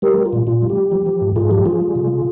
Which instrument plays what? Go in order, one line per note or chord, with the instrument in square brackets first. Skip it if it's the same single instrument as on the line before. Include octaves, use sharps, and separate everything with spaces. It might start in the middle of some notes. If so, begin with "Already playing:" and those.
[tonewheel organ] G3 G4 A#4
G3
F4
A#2
A#2 F4
G3
G4
G3
F3
F3
G#2
G#2 F4 G#4
F3 G4
F3 F4 G#4
G3
C3